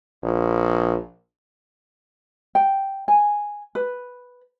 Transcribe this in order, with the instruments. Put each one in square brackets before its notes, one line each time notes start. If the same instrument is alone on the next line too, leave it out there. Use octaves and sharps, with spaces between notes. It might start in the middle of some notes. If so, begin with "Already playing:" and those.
[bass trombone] A#1
[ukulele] G5
G#5
B4